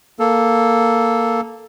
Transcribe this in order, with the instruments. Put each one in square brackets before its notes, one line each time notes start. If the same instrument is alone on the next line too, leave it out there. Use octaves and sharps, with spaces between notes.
[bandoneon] A#3 A4